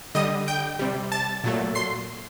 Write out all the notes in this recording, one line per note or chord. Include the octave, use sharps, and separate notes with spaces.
D3 G3 D#5 D#6
G5 G6
C3 G3
A5 A6
A#2 F#3 A3
C6 C7